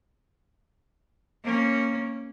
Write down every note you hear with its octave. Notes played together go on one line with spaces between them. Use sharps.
A#3 C#4